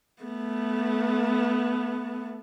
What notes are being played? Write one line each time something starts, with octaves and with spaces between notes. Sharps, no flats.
A3 B3